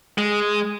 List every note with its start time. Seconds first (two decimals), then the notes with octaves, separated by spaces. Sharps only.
0.18 G#3